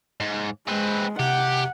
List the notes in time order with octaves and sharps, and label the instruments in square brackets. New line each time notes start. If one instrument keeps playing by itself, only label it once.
[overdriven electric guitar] G#2
[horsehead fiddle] G#3 [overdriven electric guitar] C4 B4
[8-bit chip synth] C3 [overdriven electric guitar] G4 [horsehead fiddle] F#5